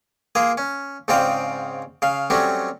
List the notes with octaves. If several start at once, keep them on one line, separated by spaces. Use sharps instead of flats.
A#3 F4 G#4
C#4
G#2 C#3 C4 F4 D5 G5
C#3 F5
F#3 G3 A3 C4 C#4